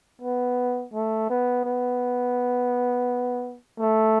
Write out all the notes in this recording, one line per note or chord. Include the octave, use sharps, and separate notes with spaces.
B3
A3
B3
B3
A3